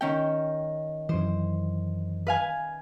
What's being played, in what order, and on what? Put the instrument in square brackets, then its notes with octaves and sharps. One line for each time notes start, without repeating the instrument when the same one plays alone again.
[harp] D#3 C#4 G5
[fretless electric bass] F#2 E3 [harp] C5
[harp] B4 F5 G#5